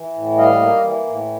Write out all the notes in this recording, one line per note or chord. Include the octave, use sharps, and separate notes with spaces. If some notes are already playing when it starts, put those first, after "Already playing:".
Already playing: E3
A2
G3 D#5 F5
A#3
E3
A2